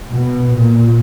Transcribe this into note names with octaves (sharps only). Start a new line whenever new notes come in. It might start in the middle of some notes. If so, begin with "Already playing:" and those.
B2
A#2